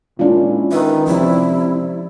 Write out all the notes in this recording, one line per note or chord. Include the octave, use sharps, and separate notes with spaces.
A#2 G#3 C#4 D4 E4 F4
D#3 B4 E5
C3 F3 D4 E4 D5